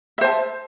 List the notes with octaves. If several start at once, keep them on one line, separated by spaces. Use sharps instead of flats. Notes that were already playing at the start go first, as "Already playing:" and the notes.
C5 E5 A5